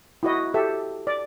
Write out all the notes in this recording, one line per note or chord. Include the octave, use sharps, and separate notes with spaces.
E4 F#4 D#5
G4 A4 E5
D5